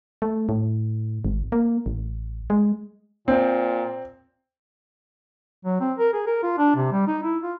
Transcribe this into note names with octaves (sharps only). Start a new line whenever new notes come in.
A3
A2
G#1
A#3
A1
G#3
A#2 C4
F#3
C4
A#4
G#4
A#4
F4
D4
C3
G3
D#4
E4
F4